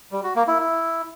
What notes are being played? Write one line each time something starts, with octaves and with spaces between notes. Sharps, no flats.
G3
F#4
A#3
E4
E4